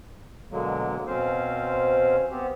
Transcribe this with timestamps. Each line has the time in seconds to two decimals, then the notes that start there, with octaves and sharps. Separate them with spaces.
0.51 B2 D3 F#3 G#3 A#3
1.07 B2 C4 C#4 C5 F5
2.31 B3 C4 G4